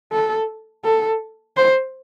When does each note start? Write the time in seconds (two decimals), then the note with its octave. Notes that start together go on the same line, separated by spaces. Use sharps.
0.12 A4
0.84 A4
1.57 C5